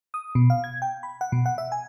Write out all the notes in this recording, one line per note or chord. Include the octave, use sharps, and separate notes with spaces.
D#6
B2
F5
G#6
G5
B5
F#5
B2
F#5
E5
G#5